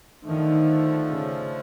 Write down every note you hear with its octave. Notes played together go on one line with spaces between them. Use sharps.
D3 D#3 F3 A3
C#3